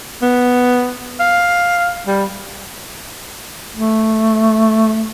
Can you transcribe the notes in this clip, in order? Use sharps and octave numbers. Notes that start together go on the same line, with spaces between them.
B3
F5
G3
A3